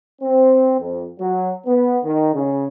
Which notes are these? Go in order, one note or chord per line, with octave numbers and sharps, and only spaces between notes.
C4
F2
F#3
B3
D#3
C#3